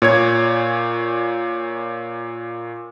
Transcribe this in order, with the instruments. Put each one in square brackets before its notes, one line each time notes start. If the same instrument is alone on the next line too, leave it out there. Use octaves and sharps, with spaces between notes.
[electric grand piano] A#2 C#5 G#6